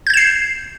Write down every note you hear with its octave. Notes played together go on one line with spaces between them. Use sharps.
G6 G#6 C7 E7